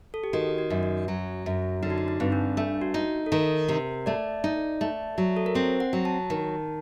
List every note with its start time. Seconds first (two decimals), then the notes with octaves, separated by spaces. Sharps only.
0.14 A4
0.24 G4
0.33 D#3 F#4
0.58 F#4
0.70 F#2
0.83 F#4
1.08 F#3
1.46 F#2
1.83 D3 D#4
1.90 F#4
1.98 D#4
2.08 D#4
2.20 G2 C4
2.32 D4
2.57 A3 D4
2.82 F#4
2.94 D#4
3.26 A4
3.32 D#3 A#4
3.69 C3
4.06 A3 D5
4.44 D#4
4.81 A3
5.18 F#3
5.37 A4
5.46 A#4
5.55 C4 C5
5.80 F#5
5.93 F#3
6.05 A5
6.30 D#3